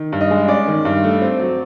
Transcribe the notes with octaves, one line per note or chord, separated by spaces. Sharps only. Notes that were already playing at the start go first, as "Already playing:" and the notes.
Already playing: D#3
G2
D#5
G#3
C#4 D5
D#3
G2
A3
C4
F#3